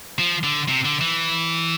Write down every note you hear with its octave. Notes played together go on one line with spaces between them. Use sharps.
F3
D3
C3
D3
E3